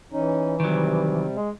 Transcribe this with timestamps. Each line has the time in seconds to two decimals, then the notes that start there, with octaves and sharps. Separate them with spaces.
0.12 E3 C#4 D#4
0.60 C3 D#3 F#3 G3
1.33 G#3